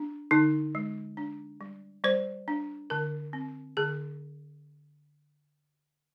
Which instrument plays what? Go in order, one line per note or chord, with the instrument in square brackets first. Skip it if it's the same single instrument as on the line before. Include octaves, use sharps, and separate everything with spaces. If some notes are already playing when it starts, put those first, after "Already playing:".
Already playing: [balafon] D4
D3 D#4
G#3
D4
G3
G3 C5
D4
D3 A#4
C4
D3 G#4